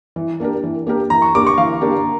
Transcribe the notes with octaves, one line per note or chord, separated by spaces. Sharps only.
E3
A#3 D4 G4 A#4
E3
A#3 D4 G4 A#4
E3 A#5
C#6
A#3 D4 G4 A#4 D6
C#6
E3 F5
A#3 D4 G4 A#4